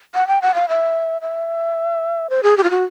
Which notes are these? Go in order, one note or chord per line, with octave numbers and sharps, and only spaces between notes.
F#5
G5
F#5
F5
E5
E5
C5
G#4
G4
F4
F#4